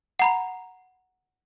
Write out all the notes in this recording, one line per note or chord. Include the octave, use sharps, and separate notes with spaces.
F#5 A#5 B5